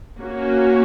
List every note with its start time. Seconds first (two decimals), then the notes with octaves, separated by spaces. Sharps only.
0.18 A#3 C#4 F#4